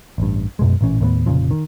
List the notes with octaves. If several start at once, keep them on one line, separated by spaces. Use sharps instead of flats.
A1 G2
F#2 B2 G#3
A1 A#2 E3 C#4
D#2 A2 A3 B3
F1 A#2 C#3 F3
D#3